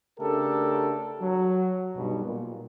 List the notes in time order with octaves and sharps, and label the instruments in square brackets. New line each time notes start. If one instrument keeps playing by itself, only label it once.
[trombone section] C#3 A3 D4 G4 A4 A#4
F#3
B1 G2 B2
A#2